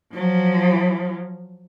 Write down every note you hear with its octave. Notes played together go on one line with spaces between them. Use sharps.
F3 F#3